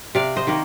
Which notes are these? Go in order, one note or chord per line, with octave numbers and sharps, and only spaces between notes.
C3 D5 F5
C5 D#5
D#3 A#3